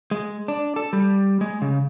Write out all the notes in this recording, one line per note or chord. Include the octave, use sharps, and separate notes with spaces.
G#3
D4
A4
G3
G#3
C#3